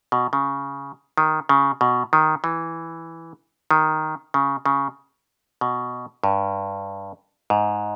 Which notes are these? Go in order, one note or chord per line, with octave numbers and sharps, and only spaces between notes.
B2
C#3
D#3
C#3
B2
D#3
E3
D#3
C#3
C#3
B2
G2
G#2